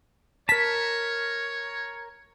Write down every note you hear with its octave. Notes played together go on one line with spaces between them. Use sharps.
A#4 C#5 A5 B6